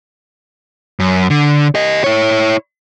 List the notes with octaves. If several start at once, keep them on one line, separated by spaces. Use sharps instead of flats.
F#2
D3
G4 D#5
E4 C#5